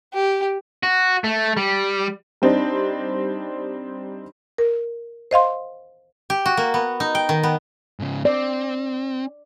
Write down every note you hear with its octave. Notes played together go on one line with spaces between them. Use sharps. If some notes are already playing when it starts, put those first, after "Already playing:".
G4
F#4
A3
G3
G3 C4 D4 D#4
A#4
C5 D#5 F5 C6
G4
F#4
A#3
B3
D#4
G5
D#3
B3
G#2 C#3
C4 D5